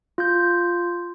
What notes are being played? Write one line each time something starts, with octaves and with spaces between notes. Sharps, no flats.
F4 G6